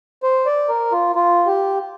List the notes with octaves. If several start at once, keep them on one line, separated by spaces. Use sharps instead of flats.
C5
D5
A#4
F4
F4
G4